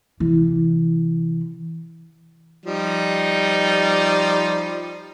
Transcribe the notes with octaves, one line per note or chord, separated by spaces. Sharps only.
C3 E3
F3 G3 D#4